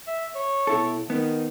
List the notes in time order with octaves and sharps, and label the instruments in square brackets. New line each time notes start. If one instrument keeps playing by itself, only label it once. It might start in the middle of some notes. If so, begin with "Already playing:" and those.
[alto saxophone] E5
C#5
[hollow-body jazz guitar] B2 E4 A4
[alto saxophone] D#3 [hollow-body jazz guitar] B3